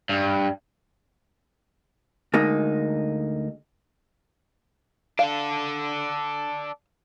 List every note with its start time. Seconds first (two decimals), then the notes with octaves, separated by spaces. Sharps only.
0.09 G2
2.33 D2 G#3 A#3 D#4
5.19 D4 A4 F5